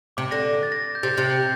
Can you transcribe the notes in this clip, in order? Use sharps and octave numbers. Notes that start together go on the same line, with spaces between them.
C3 D6
D3 A#6
A#6
A6
A#6
G6
C3 A6
C3 A6
G6